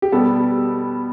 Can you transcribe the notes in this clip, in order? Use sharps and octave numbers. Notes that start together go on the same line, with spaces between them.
G4
B2 G3 B3 A4